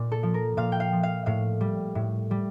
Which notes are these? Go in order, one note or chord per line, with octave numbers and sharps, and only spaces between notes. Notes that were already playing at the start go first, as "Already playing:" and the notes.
Already playing: A#2
A4
F3
A#4
A#2 F5
G5
F5
F3
F5
A2 F5
G3
A2
G3